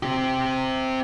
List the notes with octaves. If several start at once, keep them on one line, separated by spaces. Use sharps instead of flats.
C4 G4